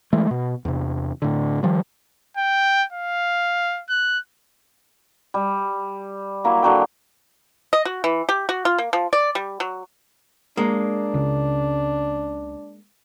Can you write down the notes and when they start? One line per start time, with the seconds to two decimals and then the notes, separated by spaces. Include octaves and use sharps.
0.13 E3 G#3 A3
0.31 B2
0.65 E2 C3
1.22 A2 D3
1.63 D#3 F3 G3
2.37 G5
2.92 F5
3.89 F#6
5.34 G3
6.44 F#3 A#3 E4
6.63 D3 F#3 G5
7.73 D#5
7.85 F#4
8.04 E3
8.29 G4
8.49 F#4
8.65 F4
8.78 A#3
8.93 F3
9.13 D5
9.35 G3
9.60 F#3
10.57 G#3 A#3 D4
11.14 C#2 C#3